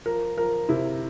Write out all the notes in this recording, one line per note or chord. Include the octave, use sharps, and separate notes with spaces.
F3 A#4
F3 A#4
C3 E4